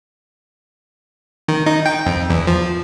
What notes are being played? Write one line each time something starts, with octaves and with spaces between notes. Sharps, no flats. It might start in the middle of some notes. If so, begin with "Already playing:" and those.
D#3
D#4
G5
F2
E2
F3